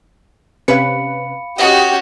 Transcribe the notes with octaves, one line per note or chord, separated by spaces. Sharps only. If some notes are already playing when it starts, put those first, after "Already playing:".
C3 C#4 B4 F5 B5 C#7
C#4 F#4 G4 D#5 F#5 D#6